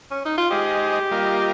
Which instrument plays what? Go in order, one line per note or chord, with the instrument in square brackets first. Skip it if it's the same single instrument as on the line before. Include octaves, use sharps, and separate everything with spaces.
[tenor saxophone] C#4
D#4
F4
[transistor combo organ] G#3 D#4 G#4 C5 D#5 [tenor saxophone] G4
[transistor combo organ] G3 A#3 F4 A#4 D#5